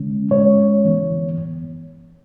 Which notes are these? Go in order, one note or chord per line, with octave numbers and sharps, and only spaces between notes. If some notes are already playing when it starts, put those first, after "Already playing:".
Already playing: D3 G#3 C#4
D3 G#3 C#4 C#5
E3 B3